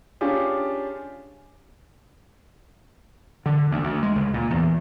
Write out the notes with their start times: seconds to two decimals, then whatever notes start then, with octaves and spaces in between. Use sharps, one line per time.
0.21 C#4 D4 F4 G4 G#4
3.46 D3
3.71 D2
3.84 D2
4.03 G#3
4.16 C#2
4.34 A#2
4.50 E2